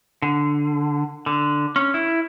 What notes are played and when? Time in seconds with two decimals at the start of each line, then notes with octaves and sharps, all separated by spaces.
0.22 D3
1.26 D3
1.76 C#4
1.94 E4